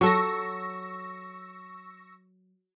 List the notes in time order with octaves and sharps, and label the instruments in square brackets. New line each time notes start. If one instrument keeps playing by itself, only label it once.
[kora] F#3 A4 [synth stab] C#6 E6 A#6